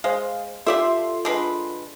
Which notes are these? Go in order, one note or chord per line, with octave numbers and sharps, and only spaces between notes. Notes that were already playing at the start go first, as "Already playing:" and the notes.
G#3 C5 F5
F4 G4 A4 D5 E5 C6
D3 G#3 B4